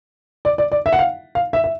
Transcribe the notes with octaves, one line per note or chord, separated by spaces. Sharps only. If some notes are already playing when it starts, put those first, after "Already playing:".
D5
D5
D5
E5
F#5
F5
F5
E5
E5